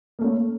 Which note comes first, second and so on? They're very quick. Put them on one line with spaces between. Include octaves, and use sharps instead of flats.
A#3 A3 C#4